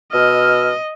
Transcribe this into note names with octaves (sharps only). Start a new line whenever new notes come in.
B2 D#5 E6 F6